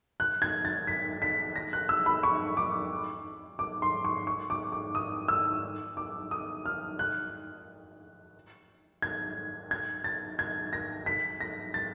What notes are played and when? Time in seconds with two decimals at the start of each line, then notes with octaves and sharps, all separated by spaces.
0.20 F#6
0.42 G#6
0.65 A6
0.87 B6
1.22 B6
1.56 A#6
1.73 F#6
1.89 E6
2.06 B5
2.23 C#6
2.57 D6
3.59 D6
3.82 C6
4.05 C#6
4.27 C#6
4.50 D6
4.72 D6
4.95 D#6
5.28 E6
5.97 D6
6.31 D#6
6.66 F6
6.99 F#6
9.02 G#6
9.71 G#6
10.04 A6
10.39 G#6
10.73 A#6
11.06 B6
11.41 A#6
11.74 A6